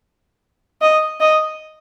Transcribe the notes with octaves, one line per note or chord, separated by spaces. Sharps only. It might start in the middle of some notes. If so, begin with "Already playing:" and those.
D#5
D#5